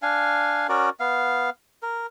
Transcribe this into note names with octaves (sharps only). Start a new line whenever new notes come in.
D4 F5 G#5
C#4 F#4 A#4 D5
B3 F5
A#4